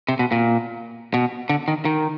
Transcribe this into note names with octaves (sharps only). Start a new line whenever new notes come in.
C3
B2
A#2
B2
D3
D#3
D#3